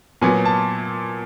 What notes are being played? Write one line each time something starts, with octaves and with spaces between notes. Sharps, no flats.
A#2 F#3 B3 G#5
A5